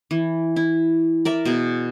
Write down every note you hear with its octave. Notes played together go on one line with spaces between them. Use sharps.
E3
E4
A#4 D5 E5
B2 G#4